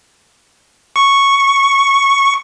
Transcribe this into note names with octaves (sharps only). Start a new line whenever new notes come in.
C#6